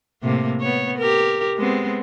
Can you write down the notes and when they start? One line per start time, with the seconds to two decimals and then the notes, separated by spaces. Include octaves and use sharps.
0.22 A2 C3 A#3
0.60 B3 C#5
0.98 G4 A#4
1.57 G#3 B3 C4